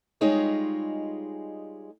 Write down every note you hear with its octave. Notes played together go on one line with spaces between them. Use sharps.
G3 G#3 D#4 F4 G#4 C#5